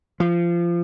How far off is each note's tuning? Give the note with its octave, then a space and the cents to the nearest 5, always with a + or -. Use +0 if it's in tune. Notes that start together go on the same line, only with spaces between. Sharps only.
F3 -25